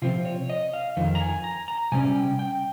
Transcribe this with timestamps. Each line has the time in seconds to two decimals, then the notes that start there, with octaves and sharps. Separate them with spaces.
0.02 C3 F3 C4 F4
0.25 C#5
0.49 D#5
0.73 F5
0.97 F2 D#3
1.15 A#5
1.20 G#5
1.44 A#5
1.68 A#5
1.92 C3 G3 C#4 G#5
2.15 G5
2.39 G5